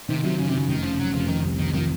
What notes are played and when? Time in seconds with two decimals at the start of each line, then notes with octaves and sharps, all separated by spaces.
0.09 C3 D#3
0.23 C3 F#3
0.39 F#2 C#3
0.49 C3
0.54 F#2 C#3
0.69 F1 D#3
0.83 C#3 F3
0.99 F1 F#3
1.14 F1 F3
1.29 D#3 F3
1.45 C2
1.59 D#3 F3
1.75 D#3 F3